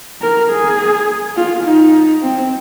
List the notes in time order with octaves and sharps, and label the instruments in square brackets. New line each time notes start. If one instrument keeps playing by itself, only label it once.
[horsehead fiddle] A#4
G#4
F4
D#4
C4